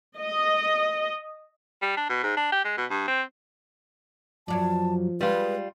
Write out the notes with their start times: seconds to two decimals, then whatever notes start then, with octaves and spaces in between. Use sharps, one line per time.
0.18 D#5
1.82 G3
1.97 D4
2.09 B2
2.23 G#2
2.37 D4
2.52 G4
2.65 G#3
2.77 B2
2.91 G2
3.08 C4
4.48 F#2 F3 F#3 D5 A5
5.21 G3 G#3 F4 B4